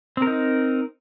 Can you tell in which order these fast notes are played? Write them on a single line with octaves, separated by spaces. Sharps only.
C4 A#4 D#4